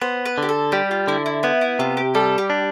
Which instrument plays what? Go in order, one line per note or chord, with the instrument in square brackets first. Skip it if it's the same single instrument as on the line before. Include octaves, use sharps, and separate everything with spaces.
[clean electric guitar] B3 [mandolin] C5
[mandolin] B4
[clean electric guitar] D3 [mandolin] G4
[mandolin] A4
[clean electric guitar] G3 [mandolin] G4
[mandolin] F4
[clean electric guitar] D3 [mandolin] E4
[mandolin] E4
[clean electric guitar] B3 [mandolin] E4
[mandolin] E4
[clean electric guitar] C3 [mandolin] F4
[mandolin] G4
[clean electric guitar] G3 [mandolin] A4
[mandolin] G4
[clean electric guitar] D4